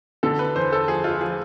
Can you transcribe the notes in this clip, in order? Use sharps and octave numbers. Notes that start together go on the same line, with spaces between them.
D3 A4
B4
E2 C5
A4
F3 G#4
F4
F3 G#4